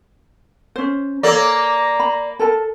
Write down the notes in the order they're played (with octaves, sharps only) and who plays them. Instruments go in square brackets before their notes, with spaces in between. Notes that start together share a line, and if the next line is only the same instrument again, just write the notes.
[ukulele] C#4 C5
[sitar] A#3 D5 [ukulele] A4 C#5 [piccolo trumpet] A#5
[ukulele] B5
A4 A#4 A5